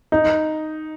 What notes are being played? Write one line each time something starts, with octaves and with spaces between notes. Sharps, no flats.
D#4